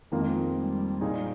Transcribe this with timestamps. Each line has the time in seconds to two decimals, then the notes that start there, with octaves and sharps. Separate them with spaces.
0.12 F2 D#3 G#3 A#3 F4
0.57 G3
1.01 A#2 G#3 D#4 G#4